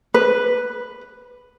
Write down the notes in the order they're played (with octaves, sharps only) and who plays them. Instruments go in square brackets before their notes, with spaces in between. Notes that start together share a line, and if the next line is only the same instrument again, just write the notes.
[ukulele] B4